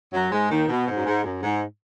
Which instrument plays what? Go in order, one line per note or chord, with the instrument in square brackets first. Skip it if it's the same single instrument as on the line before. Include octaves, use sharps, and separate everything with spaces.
[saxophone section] F#2 F#3
G#2 G#3
D#2 D#3
B2
G#2
F#2
G#2
F#2
G#2